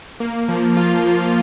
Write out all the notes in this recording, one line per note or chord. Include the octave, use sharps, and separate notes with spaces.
A#3
F3
F4
F3